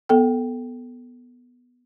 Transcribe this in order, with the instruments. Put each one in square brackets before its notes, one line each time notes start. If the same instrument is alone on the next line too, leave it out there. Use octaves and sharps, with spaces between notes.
[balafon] B3 A4 G5